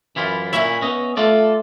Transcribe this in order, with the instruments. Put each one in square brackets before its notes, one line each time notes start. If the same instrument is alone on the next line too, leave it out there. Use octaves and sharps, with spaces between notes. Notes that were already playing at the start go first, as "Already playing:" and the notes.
[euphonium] F#2 [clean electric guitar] E3 E4 F4
[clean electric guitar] A#2 C#4 E4 [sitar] E5
[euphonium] B3 [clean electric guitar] C#4 D#5
[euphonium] A3 [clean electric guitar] F4 A4 D5